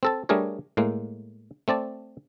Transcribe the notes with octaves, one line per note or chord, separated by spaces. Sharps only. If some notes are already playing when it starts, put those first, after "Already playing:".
C4 A4 A5
G3 A3 D4 G#4 A#4 C#5
A2 G#3 A#3
A3 C4 D5 A5